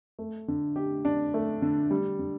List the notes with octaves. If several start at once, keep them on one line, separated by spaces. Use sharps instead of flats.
A3
D3
G4
D4
A3
D3
G3
D3